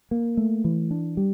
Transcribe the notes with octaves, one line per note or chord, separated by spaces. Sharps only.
A#3
A3
E3
D4
G3